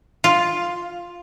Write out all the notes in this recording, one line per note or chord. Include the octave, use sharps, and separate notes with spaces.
F4